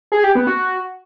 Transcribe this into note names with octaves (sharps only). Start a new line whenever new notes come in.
G#4
G4
B3
F#4